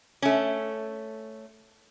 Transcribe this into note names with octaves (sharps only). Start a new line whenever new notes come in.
A3 C#4